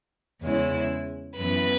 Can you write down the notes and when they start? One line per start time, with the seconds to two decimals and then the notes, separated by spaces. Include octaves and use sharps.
0.42 E2 C#3 G#3 C#4 E4
1.36 F#2 E3 B3 B4 B5